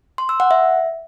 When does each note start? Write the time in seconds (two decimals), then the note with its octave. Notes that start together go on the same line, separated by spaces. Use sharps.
0.18 C6
0.29 E6
0.40 F#5
0.51 E5